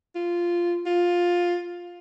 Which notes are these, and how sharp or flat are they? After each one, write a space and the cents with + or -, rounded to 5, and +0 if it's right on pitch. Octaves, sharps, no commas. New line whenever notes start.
F4 -10
F4 +10